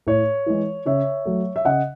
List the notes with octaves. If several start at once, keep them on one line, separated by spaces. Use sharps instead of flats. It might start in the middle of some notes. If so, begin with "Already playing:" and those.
A2 C#5
E3 G#3
C#3 C#5 E5
F#3 A3
E5
C#3 D#5 F#5